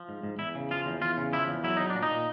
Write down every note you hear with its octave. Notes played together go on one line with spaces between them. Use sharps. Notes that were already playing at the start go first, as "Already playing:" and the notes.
Already playing: F3
G#2
G#2
E2 E4
C#3
F3 F4
E2
E2 F4
C#3
F3 E4
E2
F#3 E4
F#3 D#4
D4
A#2
D#4
A#2